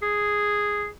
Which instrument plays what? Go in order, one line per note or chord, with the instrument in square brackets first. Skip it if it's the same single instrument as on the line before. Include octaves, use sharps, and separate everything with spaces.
[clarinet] G#4